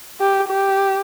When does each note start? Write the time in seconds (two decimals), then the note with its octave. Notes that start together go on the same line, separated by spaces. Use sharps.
0.21 G4
0.48 G4